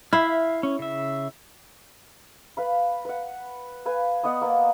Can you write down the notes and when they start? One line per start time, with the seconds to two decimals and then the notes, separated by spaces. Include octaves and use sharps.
0.13 E4 E5 F5 F6
0.63 C#4
0.79 C#3 E5
2.57 B4 F5 B5
3.05 B4 F#5
3.86 B4 F5 G#5
4.24 B3 D5 D#5 F#5
4.41 A#3 B3